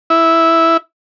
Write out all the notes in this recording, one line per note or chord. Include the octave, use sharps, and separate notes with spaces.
E4